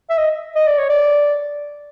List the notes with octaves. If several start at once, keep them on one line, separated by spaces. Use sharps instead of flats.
E5
D#5
D#5
D5
C#5
D5